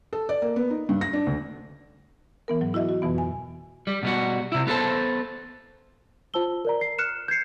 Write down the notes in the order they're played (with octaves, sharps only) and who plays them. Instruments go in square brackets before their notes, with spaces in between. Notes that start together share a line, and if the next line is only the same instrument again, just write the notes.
[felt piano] A4
D5
A#3
B3
D#4
G2
A#6
D4
D2
[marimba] E3 B3 A#4
G#2 F#3
E4 F#4 D#5 E5
F#4
F2 B2 E3 B3
G#5
[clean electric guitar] G3
B2 G3 F#4
C3 E4
B3 F4 A4 C5 A5
[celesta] F4 C5 A5 E6 G7
A#4 D5 A#5
C7
F6 F#6 C#7 E7
G6 G#6 C7 C#7